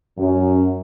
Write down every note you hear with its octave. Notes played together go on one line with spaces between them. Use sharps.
F#2